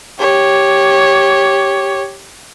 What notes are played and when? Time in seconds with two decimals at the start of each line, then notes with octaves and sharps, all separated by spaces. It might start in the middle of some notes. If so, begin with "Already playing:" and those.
0.20 G4 C#5